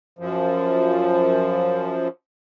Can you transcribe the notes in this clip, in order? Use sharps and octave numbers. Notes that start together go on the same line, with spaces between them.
F#2 F3